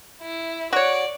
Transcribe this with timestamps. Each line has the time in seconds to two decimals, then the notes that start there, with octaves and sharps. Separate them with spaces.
0.22 E4
0.73 F#4 C#5 D5